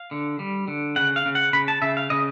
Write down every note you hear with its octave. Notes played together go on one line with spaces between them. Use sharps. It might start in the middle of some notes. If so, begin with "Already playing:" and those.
Already playing: F5
D3
G3
D3
C#3 F#5
F5
C#3
F#5
C#3 B5
A5
C#3 E5
F5
C#3 D#5